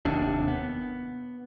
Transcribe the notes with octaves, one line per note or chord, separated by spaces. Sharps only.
F1 D#2 C3 D4
B3